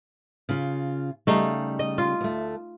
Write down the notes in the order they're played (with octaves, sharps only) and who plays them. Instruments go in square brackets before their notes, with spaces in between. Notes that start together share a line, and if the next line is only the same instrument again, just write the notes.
[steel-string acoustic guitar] C#3 F4
[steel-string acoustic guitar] C#3 G3 [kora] A3 D#4 F5
[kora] D#5
F4
[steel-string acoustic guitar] D2 A3